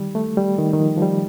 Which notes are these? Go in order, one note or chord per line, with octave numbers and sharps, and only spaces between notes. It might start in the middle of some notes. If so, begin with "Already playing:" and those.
Already playing: D#3 G3
A3
G3
D#3
D#3
F3
F3
G3